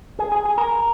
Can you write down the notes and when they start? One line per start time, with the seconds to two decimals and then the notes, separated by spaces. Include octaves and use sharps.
0.19 G#4
0.32 G#4
0.45 G#4
0.58 A#4